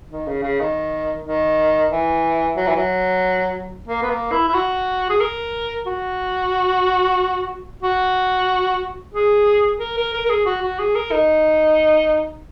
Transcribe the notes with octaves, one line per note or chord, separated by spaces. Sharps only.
D#3
C#3
C#3
D#3
D#3
E3
F#3
E3
F#3
A#3
B3
A#3
E4
E4
F#4
G#4
A#4
F#4
F#4
G#4
A#4
A#4
A#4
A#4
G#4
F#4
F#4
G#4
A#4
D#4